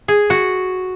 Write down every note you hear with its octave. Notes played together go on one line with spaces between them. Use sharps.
G#4
F#4